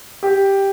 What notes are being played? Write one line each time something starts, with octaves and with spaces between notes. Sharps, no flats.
G4